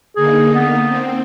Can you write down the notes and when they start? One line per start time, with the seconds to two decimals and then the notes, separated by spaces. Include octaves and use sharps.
0.16 D3 A#3 D#4 G#4
0.55 B3
0.86 C4